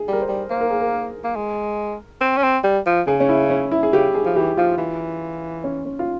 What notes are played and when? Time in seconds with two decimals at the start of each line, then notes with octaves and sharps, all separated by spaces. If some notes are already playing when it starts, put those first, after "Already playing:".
Already playing: G#4
0.08 G3 A#4
0.22 C5
0.29 G3
0.51 A#3 C5
0.61 A#4
0.70 G#4
0.81 A#4
1.24 A#3
1.36 G#3
2.21 C4
2.37 C#4
2.43 C4
2.64 G3
2.86 F3
3.07 C#3 G#4
3.20 C#4
3.29 E4
3.50 C#4
3.71 E4
3.83 G#4
3.93 C#3 G4
4.15 G#4
4.26 F3
4.36 E3 G4
4.57 F3 F4
4.78 E3
5.64 C#4
5.85 C#4
5.99 F4